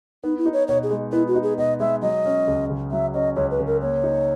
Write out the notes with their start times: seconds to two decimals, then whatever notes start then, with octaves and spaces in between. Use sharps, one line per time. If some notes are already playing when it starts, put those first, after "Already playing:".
0.24 B3 D#4
0.38 E4
0.46 D#4
0.53 C#5
0.68 B2 C#5
0.83 G#4
0.91 G#3
1.12 B3 E4
1.28 F#4
1.35 D#4
1.43 G#4
1.58 B2 D#5
1.80 G#3 E5
2.02 F#3 D#5
2.25 C#4
2.47 C#2
2.70 C#3
2.91 F#3 E5
3.14 C#4 D#5
3.36 C#2 C#5
3.51 B4
3.59 C#3
3.67 A#4
3.81 A#3 C#5
4.04 D#4